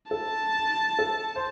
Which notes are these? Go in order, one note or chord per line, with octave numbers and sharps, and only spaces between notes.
A4 A5
A4
C5